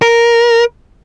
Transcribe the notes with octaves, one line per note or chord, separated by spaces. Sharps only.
A#4